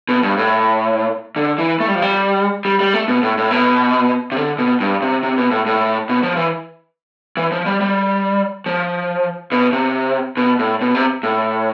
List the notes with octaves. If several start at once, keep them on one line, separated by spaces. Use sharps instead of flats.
B2
G2
A2
D3
E3
A3
G3
F3
G3
G3
G3
A3
B2
A2
A2
B2
C3
D3
B2
G2
C3
C3
B2
A2
A2
B2
F3
E3
E3
F3
G3
G3
F3
B2
C3
B2
A2
B2
C3
A2